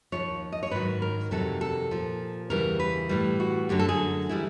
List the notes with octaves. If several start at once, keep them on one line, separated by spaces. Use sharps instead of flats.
D#2 C#3 F3 C#5
D#5
C#5
G#2 D#3 F#3 B4
A#4
F2 C3 D#3 F#3 A4
A4
A#2 F3
E2 C#3 E3 G3 A#4
B4
A2 E3 G3
F#4
F#2 D3 F#3 G4
A4
G#4
E3 G3 E4